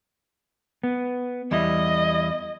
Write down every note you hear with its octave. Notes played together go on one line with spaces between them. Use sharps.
B3
E2 G3 E4 D#5